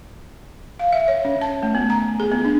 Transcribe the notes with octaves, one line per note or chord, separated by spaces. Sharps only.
F5
E5
C#5
C#4
A5
A3
B3
A#5
G#4
B3
D4